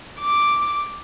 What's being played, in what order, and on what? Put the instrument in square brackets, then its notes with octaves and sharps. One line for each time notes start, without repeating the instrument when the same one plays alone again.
[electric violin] D6